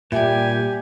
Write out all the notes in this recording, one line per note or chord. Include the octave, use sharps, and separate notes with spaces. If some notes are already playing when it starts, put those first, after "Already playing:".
A#2 G3 G4 D5 E5 G#5